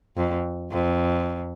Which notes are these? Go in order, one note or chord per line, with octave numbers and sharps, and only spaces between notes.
F2
F2